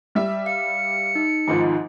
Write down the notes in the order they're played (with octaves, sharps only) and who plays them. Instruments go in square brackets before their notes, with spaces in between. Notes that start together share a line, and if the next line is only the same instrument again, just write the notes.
[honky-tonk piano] G3 E5
[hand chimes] F5 [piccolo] C#7
[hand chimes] D#4
[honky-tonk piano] G#1 G#2 F3